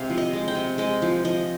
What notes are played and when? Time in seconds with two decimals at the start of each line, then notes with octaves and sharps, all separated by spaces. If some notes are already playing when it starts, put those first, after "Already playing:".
Already playing: C3 G#3 F5
0.10 F3
0.18 D#5
0.33 G#3
0.48 G5
0.55 C3
0.78 G#3 D#5
1.02 F3
1.24 F3 D#5